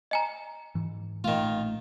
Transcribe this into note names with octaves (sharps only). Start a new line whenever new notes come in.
D#5 G#5 A#5
G#2 E3
A1 A#2 D#3 A3 F4